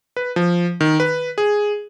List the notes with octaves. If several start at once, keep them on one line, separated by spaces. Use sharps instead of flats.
B4
F3
D#3
B4
G#4